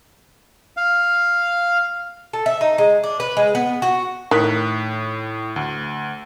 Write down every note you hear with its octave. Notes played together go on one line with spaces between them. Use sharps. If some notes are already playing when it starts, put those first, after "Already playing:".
F5
A4
E5
D#4
G#3
D4
B4
G#3
B3
F#4
A2 D#3 F#6 B6
D2